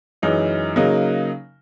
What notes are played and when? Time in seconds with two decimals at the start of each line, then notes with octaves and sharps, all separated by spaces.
0.22 F#2 E3 G#3 D#4
0.76 C#3 F#3 A#3 D#4